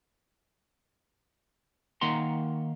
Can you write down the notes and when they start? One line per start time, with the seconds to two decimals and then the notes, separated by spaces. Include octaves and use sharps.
2.01 D#3 A#3 F#5 A#5 C6